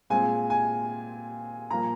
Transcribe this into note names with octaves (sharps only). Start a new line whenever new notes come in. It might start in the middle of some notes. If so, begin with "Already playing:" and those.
A#2 G#3 C4 G#5
G#5
A#2 F3 A#3 A#5